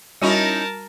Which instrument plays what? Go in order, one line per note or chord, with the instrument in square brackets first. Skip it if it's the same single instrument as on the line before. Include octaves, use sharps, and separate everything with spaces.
[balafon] G3 F#4 C#6 [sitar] C#4 D#4 E4 [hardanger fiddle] A#4 A5